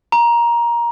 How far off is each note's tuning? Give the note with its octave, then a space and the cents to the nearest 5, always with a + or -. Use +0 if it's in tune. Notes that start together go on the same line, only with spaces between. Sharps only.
A#5 +15